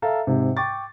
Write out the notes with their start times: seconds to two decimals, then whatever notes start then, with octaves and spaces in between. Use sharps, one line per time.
0.02 A4 E5 F5 A#5
0.27 G#2 C3
0.57 G5 C#6 D6 A6